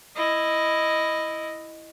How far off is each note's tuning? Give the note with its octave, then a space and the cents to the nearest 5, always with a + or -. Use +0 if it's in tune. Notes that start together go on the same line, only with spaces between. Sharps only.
E4 +0 D#5 +0